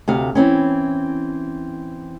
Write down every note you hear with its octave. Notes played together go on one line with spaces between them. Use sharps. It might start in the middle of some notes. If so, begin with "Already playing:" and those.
D2 C3 F5
E3 C4 C#4